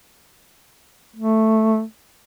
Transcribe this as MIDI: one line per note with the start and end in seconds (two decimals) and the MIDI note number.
1.16 1.83 57